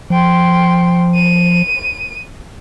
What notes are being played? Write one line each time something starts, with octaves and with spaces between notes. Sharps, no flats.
F3 G5 C6
D#7